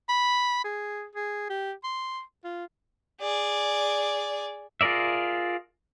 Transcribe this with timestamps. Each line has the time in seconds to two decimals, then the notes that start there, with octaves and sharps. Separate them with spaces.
0.09 B5
0.64 G#4
1.15 G#4
1.50 G4
1.84 C6
2.44 F4
3.21 G#4 D5
4.81 F4 G#4 A#4 D5 E5